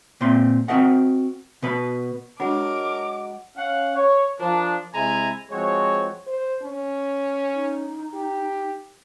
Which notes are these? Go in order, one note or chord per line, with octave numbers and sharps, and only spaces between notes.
A#2 C4 C6
C4 F#4 A#4 D#5 F#5
B2 B4 B5
F#3 G#3 D4 A#4 D6
C#4 F5 F#5
C#5
F3 D4 A#4
C3 G#3 E4 G#5 A#5 B5
F3 G#3 C4 F#4 C#5
C5
C#4
D#4
G4